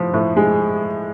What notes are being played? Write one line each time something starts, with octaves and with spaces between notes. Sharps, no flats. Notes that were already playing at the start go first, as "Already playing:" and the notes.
Already playing: A2 F3
A2
G#3